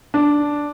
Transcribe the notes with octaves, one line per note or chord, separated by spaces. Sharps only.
D4